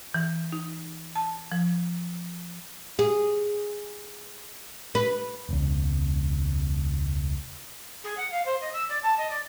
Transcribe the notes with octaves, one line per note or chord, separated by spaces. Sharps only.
E3
D#4
A5
F3
G#4
B4
E1 C#2
G#4
F#5
F5
C5
D#5
E6
D5
A5
D#5
D5